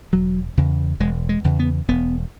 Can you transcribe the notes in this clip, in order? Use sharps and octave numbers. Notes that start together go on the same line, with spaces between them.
E1 F#3
E2 C#3
E1 G#3
G#3
E2 C#3
B3
E1 B3